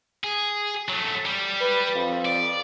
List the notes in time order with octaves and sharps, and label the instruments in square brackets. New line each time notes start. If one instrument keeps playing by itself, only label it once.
[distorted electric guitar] G#4
F#3 A3
G3
[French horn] B4
F2
[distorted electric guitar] D5